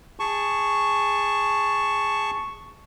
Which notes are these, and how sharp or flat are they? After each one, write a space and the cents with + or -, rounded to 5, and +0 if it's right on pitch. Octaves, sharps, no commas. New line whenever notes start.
G#4 -15 A5 +0 C#6 +0